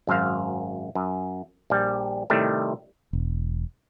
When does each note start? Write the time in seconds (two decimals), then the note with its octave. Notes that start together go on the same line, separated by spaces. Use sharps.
0.07 G#1 F#2 C5 F5
0.95 F#2
1.70 A#1 G3
2.30 A2 C3 D#3 G3 A3
3.13 E1